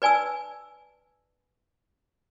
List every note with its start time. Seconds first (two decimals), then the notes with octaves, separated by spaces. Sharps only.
0.02 B4 D5 G#5 A5 E6